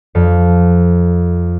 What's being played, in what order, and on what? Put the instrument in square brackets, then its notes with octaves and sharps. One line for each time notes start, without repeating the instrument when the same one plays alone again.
[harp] F2